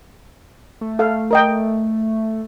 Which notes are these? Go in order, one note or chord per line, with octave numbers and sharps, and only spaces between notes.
A3
A4 F5
A#4 D#5 G5